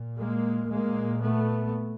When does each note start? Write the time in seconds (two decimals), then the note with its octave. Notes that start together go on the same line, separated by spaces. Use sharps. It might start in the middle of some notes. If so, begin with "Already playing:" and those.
Already playing: A#2
0.18 G#3 A#3
0.70 A#2 G#3 A#3
1.23 A3 B3